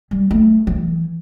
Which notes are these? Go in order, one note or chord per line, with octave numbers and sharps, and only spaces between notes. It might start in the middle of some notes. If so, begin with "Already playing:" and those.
G3
A3
E3